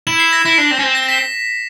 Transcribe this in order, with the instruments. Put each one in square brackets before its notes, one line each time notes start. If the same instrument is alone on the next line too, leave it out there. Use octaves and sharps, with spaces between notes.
[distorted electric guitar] E4 [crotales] E7
[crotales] C7
A#6
[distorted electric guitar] E4 [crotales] A#6
[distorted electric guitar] D4
C4
C#4
C4
[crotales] A#6
B6